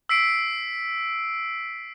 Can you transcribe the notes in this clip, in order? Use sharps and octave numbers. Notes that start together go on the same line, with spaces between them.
E6 B6 C7 D7